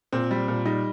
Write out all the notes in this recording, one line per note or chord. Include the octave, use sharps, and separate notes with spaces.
A#2 C4
G3
A#2
G3 D#4